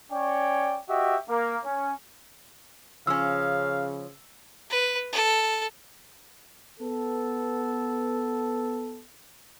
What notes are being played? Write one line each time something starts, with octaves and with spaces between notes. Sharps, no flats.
C#4 C#5 D5 G5
F#4 G4 D#5 E5
A#3
C#4
C#3 F3 C#4 F5 E6
B4
A4
B3 A4